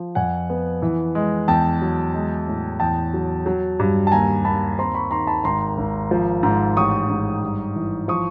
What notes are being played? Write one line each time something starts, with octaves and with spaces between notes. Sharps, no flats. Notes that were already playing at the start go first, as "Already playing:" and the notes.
Already playing: F3
F2 F#5 G#5
B3
E3
G#3
E2 G5 A5
F#3
G#3
A2
E2 G5 A5
F#3
F#3
G2
A5
D#2 G#5 A#5
D#2 A5 B5
C4 A#5 C6
B5 C#6
D#3 A#5 C6
A5 B5
G#1 A#5 C6
G#1
F3
G#2
A1 C#6 D#6
G#2
G2
E3
F3 C#6 D#6